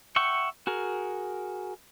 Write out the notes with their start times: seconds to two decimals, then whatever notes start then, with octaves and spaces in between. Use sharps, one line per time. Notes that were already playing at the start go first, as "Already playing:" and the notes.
0.16 E5 F#5 G5 C#6
0.67 F#4 G#4 A#4